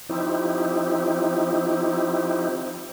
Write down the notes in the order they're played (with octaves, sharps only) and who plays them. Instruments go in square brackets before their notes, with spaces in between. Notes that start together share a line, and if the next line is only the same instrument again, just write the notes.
[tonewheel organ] F3 C4 D#4 E4 G4